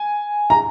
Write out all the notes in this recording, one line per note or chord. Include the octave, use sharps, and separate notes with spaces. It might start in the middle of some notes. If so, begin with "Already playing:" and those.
Already playing: G#5
A#5